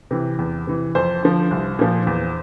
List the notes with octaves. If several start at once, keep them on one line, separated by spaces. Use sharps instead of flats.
C3 E3
E2
C3 E3
F2 C5
D3 F3
C2
A#2 F3
E2